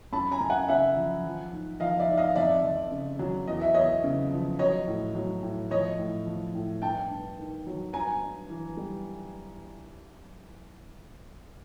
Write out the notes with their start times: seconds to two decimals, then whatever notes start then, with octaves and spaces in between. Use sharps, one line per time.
0.12 F#2 A5 B5
0.32 G#5 A#5
0.40 F#2
0.50 F#5 G#5
0.68 C#3 E5 F#5
0.97 F3
1.25 F3
1.53 G#2
1.80 F3 D#5 F5
1.99 D5 E5
2.09 G#2
2.17 D#5 F5
2.36 F2 D5 E5
2.64 F2
2.91 C#3
3.19 F#3
3.47 E2 D#5
3.61 E5
3.74 E2 C#5 D#5
4.04 C#3
4.31 F3
4.59 F#3 C#5 D#5
4.87 A2
5.15 F#3
5.43 A2
5.71 F3 C#5 D#5
5.99 A2
6.27 F3
6.55 A2
6.82 G2 G5 A5
7.11 G2
7.38 D#3
7.67 F#3
7.93 G2 G#5 A#5
8.22 G2
8.50 E3
8.77 G3